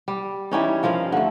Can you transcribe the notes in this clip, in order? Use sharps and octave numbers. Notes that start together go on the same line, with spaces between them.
G3
E3 G3 C#4 D#4
G2 F3 A#4 F5
D3 A3